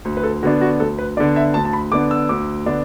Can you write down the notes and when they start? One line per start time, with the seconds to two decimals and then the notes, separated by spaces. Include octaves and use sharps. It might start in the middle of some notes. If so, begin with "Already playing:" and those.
0.05 D2
0.17 B4
0.24 A4
0.43 D3 B3 D4 F#4
0.61 F#4
0.80 D2 A4
0.99 B4
1.17 D3 B3 D4 D5
1.36 E5
1.54 D2 A5
1.65 A5
1.73 B5
1.92 D3 B3 D4 D6
2.11 E6
2.29 D2 D6
2.66 D3 B3 D4